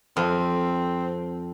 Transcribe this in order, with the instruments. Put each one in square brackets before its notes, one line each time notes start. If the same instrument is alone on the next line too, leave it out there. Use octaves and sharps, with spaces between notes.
[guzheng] F2 [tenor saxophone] C4